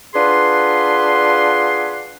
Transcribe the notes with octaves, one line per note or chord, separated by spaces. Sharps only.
D4 F4 G#4 B4 F#5 C6